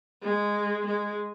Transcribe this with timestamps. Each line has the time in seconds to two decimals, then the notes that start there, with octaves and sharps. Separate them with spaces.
0.22 G#3
0.86 G#3